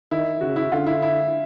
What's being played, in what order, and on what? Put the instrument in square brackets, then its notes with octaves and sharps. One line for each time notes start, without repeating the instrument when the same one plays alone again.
[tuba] D#3 [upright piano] E4
[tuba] C#3 [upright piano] F#4
[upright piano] E4
[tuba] D3 [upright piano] F4
[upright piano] E4
E4